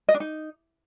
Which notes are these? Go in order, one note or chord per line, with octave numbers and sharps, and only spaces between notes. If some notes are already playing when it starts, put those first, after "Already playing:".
D#5
D4
D#4